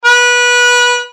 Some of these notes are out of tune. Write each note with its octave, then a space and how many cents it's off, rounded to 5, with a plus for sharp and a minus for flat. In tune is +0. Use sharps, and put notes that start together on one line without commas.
B4 -20